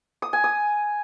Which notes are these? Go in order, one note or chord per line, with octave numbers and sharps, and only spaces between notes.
D#6
G#5
D#6